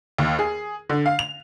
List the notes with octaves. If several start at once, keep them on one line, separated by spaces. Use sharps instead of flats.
D#2
G#4
D3
F5
F7